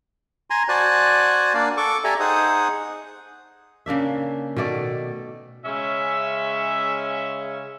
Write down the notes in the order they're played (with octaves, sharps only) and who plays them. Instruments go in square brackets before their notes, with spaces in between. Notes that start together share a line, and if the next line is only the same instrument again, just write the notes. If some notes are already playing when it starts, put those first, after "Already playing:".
[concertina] G#5 A#5 C6
F#4 C5 D5 G#5 A5 F#6
A#3 D4 D5 F5
A4 C#6 D6
G4 A4 D5 E5 G#5 A#5
D#4 G#4 C5 F#5 D#6
[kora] C#3 A#3 D4 E5
B2 D#3 A3 D5
[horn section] C#3 G#3 C#4 C#5 E5